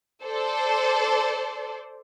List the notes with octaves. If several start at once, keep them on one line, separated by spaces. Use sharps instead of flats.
A4 C5 D5